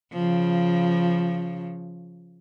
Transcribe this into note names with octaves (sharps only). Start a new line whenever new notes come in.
C#3 F3